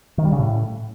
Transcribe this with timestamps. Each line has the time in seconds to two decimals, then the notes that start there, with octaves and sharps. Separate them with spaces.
0.18 D#3
0.25 G3
0.32 C#3
0.39 A2